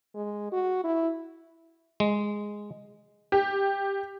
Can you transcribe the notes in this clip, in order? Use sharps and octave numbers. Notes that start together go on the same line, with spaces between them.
G#3
F#4
E4
G#3
G4